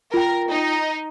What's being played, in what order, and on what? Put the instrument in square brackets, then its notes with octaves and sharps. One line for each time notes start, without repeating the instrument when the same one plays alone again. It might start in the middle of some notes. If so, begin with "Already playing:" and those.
[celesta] F4 G5 [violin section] A#4
[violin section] D#4